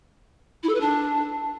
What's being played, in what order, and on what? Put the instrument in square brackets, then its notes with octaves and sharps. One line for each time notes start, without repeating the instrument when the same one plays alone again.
[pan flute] E4
A4
B4
D4